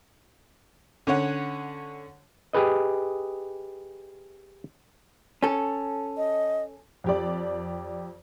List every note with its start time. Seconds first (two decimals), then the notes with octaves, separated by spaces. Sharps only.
1.07 D3 C#4 C#5 F#5
2.53 G4 G#4 B4 D#5
5.43 C#4 A4
6.17 D#5
7.04 F2 G4 D5